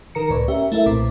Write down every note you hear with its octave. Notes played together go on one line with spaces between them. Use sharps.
D#3 A#4 A#5 C#7
C#2 A2 B4 D5 C#6
C#4 G4 A#4 E5
A3 E4 A4 A#4 E5
B1 A#2 C4 D6